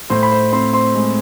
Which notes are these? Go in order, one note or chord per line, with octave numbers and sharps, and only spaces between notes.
A2 C5 C6
B5
C5 C6
C4 C5 C6
C5 C6
G#3